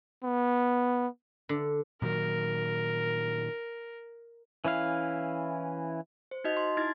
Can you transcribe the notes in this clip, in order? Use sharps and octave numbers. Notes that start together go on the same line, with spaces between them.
B3
D3
A#2 D#3 F#3 A#4
E3 C#4 E4 F5
C5
D#4 F#4 D#5
C6
D#4 E4 G#6 A6